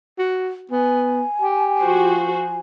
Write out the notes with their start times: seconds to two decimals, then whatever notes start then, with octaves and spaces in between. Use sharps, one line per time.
0.19 F#4
0.71 B3 G#5
1.42 G4
1.81 F3 F#4 C5